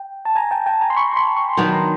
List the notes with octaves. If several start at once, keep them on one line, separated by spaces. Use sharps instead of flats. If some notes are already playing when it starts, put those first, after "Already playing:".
Already playing: G5
A5
G#5 A#5
G5 A5
G5 A5
G#5 A#5
C6
B5 C#6
C6
B5 C#6
C#6
C6
D#3 F#3 B3 D4 B5
A#5 C6